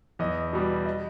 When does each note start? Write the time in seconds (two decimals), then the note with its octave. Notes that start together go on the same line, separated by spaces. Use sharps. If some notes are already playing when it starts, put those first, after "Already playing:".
0.19 E2 D#5
0.53 B2 G3
0.86 D#5